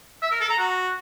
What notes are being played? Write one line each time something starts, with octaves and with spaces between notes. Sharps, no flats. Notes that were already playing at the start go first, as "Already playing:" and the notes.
E5
A#4
A4
A#5
F#4